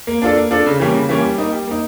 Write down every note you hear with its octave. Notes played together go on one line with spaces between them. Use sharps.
A#3
D4 F4 A4 D5
A#3
D4 F4 A4 D5
C#3
E3 G3 A#3 C#4
C#3
E3 G3 A#3 C#4
G3
A#3 D#4
G3
A#3 D#4